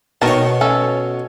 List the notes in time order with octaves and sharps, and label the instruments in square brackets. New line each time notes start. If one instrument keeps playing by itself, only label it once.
[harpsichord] B2 C#5 [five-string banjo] D#3 A#4 A5
[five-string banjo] C#4 A4